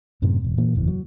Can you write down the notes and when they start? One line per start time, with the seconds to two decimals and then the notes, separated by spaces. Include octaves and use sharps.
0.22 F#2 A2 C3
0.44 E1
0.58 A#2 E3 A#3
0.75 F#1 E2 E3
0.87 F#3